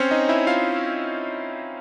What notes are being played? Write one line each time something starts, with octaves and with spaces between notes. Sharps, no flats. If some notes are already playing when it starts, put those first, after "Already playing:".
Already playing: C4 C#4 C5 C#5
D#4 D#5
E4 E5
F4 F5